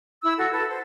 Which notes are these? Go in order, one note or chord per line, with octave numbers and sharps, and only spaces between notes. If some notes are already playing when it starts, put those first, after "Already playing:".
E4 E6
F#4 A4
A4 B4
C5